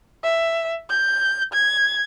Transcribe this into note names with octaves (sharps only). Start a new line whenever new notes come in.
E5
G6
G#6